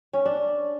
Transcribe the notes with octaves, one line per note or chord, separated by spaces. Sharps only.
C#4
D4